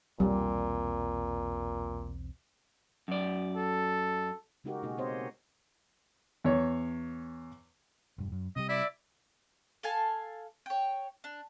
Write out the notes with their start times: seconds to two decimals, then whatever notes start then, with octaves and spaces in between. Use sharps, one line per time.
0.20 B1 E2 A#2 G3 C4
3.08 F#2 D5
3.56 A4
4.64 C#3 G#3 D#4 F#4 G4 A#4
4.83 B2 G#3 A#3 D#4 F#4 G#4
4.98 B3 C4 G4 C5 C#5 D#5
6.44 E2 C#5
8.18 E1 G2
8.32 F#2
8.56 C3 F#3 G3 D#5
8.69 E4 D5 E5
9.83 A4 F5 G#5 A5
10.66 C#5 G5
11.24 D4